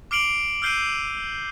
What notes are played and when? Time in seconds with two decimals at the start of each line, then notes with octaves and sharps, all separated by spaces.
0.11 D6 F6 C7 D7 F7 F#7
0.62 E6 F6 G6 C7 D7 D#7